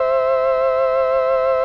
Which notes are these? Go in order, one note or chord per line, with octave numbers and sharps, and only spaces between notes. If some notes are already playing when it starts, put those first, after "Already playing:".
Already playing: C5 E5